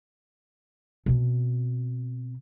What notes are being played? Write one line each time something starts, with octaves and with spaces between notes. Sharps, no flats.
B2 C4